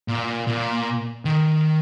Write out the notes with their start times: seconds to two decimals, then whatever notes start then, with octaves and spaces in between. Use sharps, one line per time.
0.08 A#2
0.47 A#2
1.25 D#3